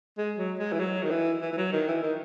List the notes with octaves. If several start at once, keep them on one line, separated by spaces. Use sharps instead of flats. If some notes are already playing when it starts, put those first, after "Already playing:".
G#3
F#3
G#3
E3
F#3
D#3
E3
E3
E3
F#3
D#3
E3
D#3